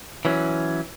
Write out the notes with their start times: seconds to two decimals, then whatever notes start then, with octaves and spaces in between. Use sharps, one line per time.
0.25 E3 F#3 C#4